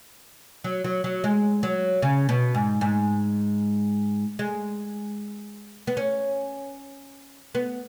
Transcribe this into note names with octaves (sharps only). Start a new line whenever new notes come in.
F#3
F#3
F#3
G#3
F#3
C#3
B2
G#2
G#2
G#3
B3
C#4
B3